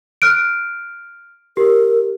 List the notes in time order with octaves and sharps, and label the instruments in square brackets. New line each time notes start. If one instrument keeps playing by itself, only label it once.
[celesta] F6 F#6 D7
[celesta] G4 [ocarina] A#4